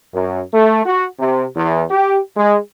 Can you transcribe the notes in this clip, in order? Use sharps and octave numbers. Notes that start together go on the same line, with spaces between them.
F#2
A3
F#4
C3
E2
G4
G#3